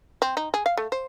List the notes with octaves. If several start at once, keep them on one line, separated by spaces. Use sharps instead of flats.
C4
D#4
G#4
F5
A3
C5